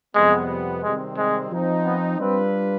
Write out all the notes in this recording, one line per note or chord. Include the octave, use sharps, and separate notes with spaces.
F2 C3 G3 G#3 B3
C3 D#3 G3 G#3 C4
G#3
F3 C4 D#4
B3
G3 C4 D4 F4 B4